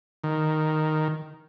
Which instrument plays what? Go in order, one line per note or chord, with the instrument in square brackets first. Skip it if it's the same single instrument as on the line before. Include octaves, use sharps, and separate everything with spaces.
[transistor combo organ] D#3